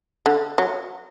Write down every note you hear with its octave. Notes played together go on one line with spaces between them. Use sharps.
D3
F#3